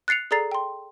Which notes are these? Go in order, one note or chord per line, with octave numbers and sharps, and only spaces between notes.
F#6 A6 C7 C#7 F7
G#4 A4 D5 A#5 A6 C7
G5 C6